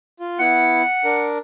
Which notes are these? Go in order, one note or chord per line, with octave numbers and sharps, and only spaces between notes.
F4
B3 E4 F#5
D4 A#4